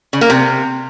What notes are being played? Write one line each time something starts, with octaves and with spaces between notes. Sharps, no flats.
C#3
A#3
C3